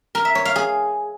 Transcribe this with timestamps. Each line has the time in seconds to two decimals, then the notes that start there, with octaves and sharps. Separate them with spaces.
0.15 A#4
0.25 E5
0.35 C#5
0.45 F5
0.56 G#4